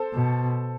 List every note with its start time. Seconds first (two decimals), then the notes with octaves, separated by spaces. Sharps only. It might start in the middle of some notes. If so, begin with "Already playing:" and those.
Already playing: A4 C5
0.14 B2